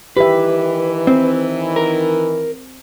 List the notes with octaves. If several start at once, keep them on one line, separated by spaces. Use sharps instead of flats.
D#3 E3 G4 B4 E5
C4
A#4